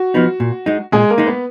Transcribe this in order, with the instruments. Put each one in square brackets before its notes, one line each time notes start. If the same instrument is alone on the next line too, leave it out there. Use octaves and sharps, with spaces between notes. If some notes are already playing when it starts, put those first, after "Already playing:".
Already playing: [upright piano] F#4
[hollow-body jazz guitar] F3 B3 D#4
A#2
G#3 D#4
[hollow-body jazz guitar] A#2 [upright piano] G#3 G#4
[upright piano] A#3 A#4
[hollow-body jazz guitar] G#3 D#4
[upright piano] B3 B4